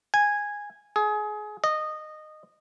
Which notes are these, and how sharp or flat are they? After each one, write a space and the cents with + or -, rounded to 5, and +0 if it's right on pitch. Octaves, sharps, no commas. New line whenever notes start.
G#5 -10
G#4 +25
D#5 -15